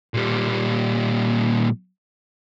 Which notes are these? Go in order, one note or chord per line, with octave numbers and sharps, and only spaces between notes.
A#2 G3